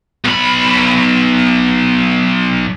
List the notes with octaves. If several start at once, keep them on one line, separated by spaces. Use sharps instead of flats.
B1 B5